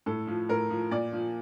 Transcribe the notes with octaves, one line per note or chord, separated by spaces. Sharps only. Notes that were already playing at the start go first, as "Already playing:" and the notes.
A2 A4
F3
A2 A#4
F3
A#2 D5
F3